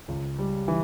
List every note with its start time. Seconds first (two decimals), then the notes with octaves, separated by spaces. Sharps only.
0.08 C#2
0.39 G3
0.68 E3